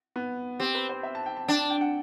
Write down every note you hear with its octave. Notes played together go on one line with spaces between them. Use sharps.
B3
C4 G4
B4
C5
E5
A5
G5
A5
D4 G5
A5
G5
F#5